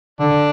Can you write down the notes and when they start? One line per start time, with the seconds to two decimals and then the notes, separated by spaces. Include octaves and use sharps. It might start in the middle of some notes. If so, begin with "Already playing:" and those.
0.20 D3 D4